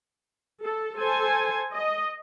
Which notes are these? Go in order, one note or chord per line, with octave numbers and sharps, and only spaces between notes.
A4
A4 C5 G#5
D#5